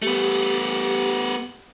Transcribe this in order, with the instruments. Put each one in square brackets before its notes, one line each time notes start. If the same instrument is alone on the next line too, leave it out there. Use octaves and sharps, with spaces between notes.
[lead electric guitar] A3 B3 [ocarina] G4